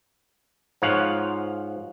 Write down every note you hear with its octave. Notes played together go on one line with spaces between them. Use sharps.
G#2 F3 C#5 F5 F#5